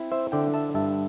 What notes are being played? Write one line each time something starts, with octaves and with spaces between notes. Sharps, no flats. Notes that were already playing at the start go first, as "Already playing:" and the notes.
Already playing: C4 E4
C5 E5
D3 D5 G5
E5 A5
G2 E5 A5